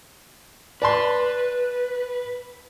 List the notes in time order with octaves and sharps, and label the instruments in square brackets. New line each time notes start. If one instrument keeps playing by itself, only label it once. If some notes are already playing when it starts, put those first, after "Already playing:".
[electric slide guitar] B4 [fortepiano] D5 A5 C6